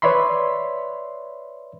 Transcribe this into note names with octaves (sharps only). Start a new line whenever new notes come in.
B4 C#5 D5 E5 B5 C6